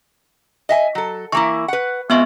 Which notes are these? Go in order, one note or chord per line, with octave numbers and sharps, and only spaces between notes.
D#5 E5 G#5
F#3 A4
E3 A#3 E4 C#6
B4 F#5
G#3 B3 C4 F4 E5 C#6